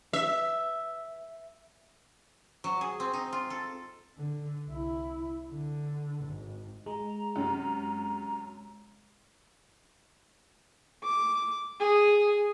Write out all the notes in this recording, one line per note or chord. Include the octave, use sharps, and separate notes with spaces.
E5
F#3
G#4
C4
D#4
F4
A4
D3
C2 E4
D3
G#1
G#3 A#5
F#2 C3
D6
G#4